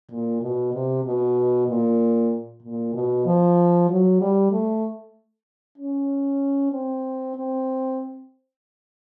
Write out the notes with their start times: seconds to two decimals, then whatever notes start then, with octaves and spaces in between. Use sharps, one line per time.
0.10 A#2
0.42 B2
0.74 C3
1.04 B2
1.68 A#2
2.62 A#2
2.94 B2
3.26 F3
3.89 F#3
4.20 G3
4.51 A3
5.78 C#4
6.72 C4
7.36 C4